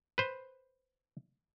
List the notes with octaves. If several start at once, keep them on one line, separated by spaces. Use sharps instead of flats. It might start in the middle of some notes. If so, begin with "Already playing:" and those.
B4 C5